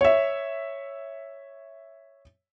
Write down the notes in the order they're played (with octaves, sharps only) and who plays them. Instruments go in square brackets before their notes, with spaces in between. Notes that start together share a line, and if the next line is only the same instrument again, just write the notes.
[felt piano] C#5 E5